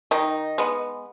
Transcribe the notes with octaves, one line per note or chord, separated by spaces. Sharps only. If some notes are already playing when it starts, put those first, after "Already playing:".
D#3 D#4
G#3 B3